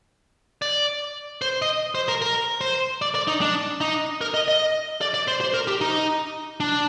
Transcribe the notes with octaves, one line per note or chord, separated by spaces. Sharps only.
D5
C5
D#5
C5
A#4
A#4
C5
D5
D5
D#4
D4
D#4
A#4
D#5
D#5
D5
D5
C5
C5
A#4
G4
D#4
D4